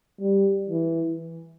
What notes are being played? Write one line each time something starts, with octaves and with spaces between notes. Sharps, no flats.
G3
E3